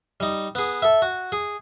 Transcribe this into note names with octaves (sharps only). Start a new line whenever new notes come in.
G3 D#4
B3 G#4
A4 E5
F#4
G#4